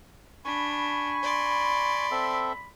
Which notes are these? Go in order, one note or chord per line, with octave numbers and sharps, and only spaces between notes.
D4 G#5 B5 C#6
D5 C6
C4 A4 E5